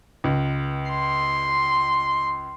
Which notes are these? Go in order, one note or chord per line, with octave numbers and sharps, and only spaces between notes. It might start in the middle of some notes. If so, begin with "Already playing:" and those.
C#2
C6